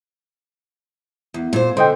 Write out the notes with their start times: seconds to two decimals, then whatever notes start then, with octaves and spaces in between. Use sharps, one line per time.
1.34 E2
1.53 A#2 C5
1.77 D3 C5 D#5 G5